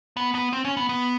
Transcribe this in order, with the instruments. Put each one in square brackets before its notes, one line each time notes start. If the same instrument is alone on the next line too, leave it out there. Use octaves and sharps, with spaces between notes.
[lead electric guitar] B3
B3
C4
C#4
B3
B3